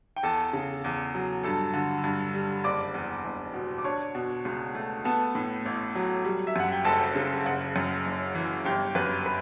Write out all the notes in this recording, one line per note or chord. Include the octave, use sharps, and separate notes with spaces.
G5
E2 A4 A5
C#3
E2
F#3
G2 A4 A5
D3
G2
G3
F#1 D5 D6
E2
F#1
B2
D6
D4 C#5 C#6
B2
C#2
A3
B3 A4 A5
A2
A1
F#3
G3
E5
F#2 F#5
G5
F#1 A4 A5
C#3
F#1 F#5
F#2
F#1
E3
G1 G4 G5
F#2 B4 B5
B4 B5